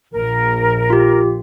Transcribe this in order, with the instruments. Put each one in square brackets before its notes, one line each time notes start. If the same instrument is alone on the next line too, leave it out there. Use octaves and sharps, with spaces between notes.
[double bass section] A#1 [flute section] A#4
[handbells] F4 G4